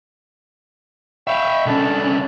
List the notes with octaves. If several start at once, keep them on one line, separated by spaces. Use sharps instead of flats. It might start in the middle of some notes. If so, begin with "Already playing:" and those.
E5 F5 G5 B5 C#6
C2 C#4 D4 A4